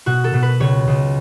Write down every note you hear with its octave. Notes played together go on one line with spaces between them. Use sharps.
B2 F#4
A4
B2
B4
C#2 C#5
C#2